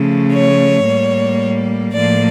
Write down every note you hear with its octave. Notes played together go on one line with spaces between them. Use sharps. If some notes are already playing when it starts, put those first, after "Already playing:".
Already playing: C#3 F3 A3
C#5
A2 G3 A#3
A2 F3 A#3 D5